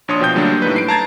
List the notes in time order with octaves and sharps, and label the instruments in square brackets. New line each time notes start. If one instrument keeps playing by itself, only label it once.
[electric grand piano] A#1 D4 C#5 C6 D#6
B2 F3 G5 G6
D3 F#3 G3 A3 A#3 D4
A2 D#4 B4
C7 D7
A5 A#5 G#6 A6